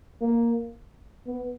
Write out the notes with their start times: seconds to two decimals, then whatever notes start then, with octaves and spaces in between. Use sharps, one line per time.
0.21 A#3
1.26 B3